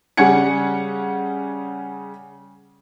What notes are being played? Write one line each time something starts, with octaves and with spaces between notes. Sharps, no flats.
C#3 G3 C#4 F#5 G#6 C#7